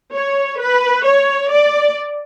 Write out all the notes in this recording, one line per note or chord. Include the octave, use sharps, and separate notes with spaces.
C#5
B4
C#5
D5